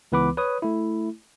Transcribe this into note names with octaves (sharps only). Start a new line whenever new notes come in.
C#2 E3 B3 B4 B5 D6
B4 C#5 D#6
A3 E4